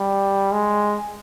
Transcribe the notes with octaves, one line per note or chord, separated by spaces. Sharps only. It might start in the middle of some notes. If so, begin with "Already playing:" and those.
Already playing: G3
G#3